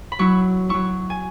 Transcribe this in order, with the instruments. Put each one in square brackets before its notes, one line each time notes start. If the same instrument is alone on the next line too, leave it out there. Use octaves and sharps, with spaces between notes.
[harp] B5
F#3 E4 C#6
F#3 E4 C#6
G#5